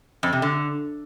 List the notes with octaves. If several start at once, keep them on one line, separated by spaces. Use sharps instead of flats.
F2
C3
D3